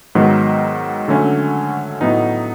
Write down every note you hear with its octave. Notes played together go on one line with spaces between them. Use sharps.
G#2 D#3 F#3 B3
D3 F#3 A3 C#4
A2 F#3 B3 D#4